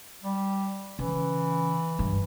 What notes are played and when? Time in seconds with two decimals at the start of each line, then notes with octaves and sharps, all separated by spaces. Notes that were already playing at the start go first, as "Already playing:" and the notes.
0.23 G3
0.99 C#3 E3
1.99 G2